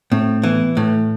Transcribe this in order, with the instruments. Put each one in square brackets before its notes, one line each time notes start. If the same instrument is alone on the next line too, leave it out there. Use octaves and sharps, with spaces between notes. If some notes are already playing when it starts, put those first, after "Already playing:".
[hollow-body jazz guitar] A2 [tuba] C4
[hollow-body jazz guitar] E3 [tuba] B3
[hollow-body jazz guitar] A2 [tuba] A3